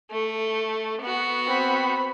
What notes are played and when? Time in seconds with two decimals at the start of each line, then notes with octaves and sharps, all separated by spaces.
0.11 A3
1.02 B3 F#4
1.46 C4 B5